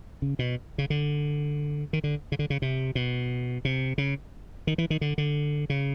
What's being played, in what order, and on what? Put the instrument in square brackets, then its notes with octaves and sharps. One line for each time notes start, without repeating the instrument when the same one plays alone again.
[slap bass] C#3
B2
C#3
D3
D#3
D3
C#3
D3
C#3
C3
B2
C3
C#3
D#3
E3
D#3
D3
D3
C#3